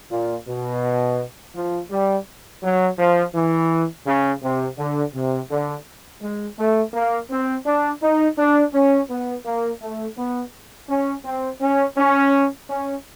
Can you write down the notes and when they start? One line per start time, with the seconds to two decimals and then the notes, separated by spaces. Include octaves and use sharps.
0.10 A#2
0.47 B2
1.55 F3
1.91 G3
2.63 F#3
2.98 F3
3.34 E3
4.06 C#3
4.42 C3
4.78 D3
5.14 C3
5.50 D3
6.21 G#3
6.57 A3
6.93 A#3
7.30 C4
7.66 D4
8.02 D#4
8.37 D4
8.74 C#4
9.09 B3
9.45 A#3
9.81 A3
10.17 B3
10.88 C#4
11.24 C4
11.60 C#4
11.96 C#4
12.68 C#4